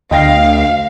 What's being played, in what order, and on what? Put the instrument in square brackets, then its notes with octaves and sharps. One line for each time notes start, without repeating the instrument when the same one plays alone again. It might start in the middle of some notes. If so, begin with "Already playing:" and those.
[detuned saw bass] D2 [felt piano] D#5 G5 A#6 [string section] F5